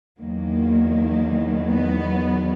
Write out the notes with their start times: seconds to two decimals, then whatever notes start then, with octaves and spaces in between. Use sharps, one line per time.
0.19 E2 D#3 F#3 A#3
1.70 B3